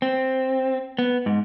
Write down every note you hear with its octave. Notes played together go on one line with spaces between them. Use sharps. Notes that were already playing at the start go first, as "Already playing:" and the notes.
C4
B3
G#2